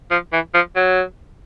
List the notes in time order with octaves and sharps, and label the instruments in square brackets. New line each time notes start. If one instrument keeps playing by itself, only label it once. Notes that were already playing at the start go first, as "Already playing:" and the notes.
[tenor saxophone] F3
E3
F3
F#3